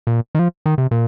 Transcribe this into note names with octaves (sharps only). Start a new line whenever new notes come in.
A#2
D#3
F3
D#3
C3
A#2